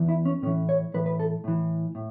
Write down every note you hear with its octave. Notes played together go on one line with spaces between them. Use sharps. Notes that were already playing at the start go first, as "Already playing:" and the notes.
Already playing: E2 E3
E4
C#4
A2 E3 C#4
C#5
A2 E3 B4
B4
A4
A2 E3
A2